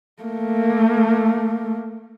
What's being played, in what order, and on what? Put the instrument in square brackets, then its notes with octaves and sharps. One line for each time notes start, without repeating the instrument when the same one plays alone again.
[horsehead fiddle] A3 A#3